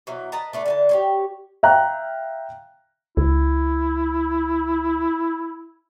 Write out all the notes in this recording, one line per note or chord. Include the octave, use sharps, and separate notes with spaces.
B2 E3 F#3
B4 D#5 A5 A#5
A3 D4 B4
D3 E3 A5
G4 G#4 C#5
E5 F5 G5 A#5 F#6
C#2 E4